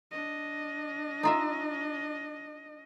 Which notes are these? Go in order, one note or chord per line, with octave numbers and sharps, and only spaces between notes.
D4 D#5
D#4 F4 E5